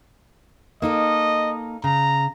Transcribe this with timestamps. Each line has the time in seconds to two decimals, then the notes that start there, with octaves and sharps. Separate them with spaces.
0.82 A#3 D#4 A4 D#5
1.84 C#3 A#5